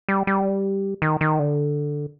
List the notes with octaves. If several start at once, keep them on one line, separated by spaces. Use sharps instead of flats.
G3
G3
D#3
D#3
D3